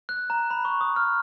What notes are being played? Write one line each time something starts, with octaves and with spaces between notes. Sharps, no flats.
F#6
A#5
B5
C#6
D#6
F6